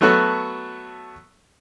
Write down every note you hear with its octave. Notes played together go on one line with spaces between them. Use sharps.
F#3 A3 B3 F#4 A4